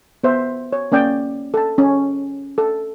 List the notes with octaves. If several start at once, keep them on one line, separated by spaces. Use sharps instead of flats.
B3 C5 E5
C#5
A#3 C#4 D5 G5
A4 A5
C#4
A4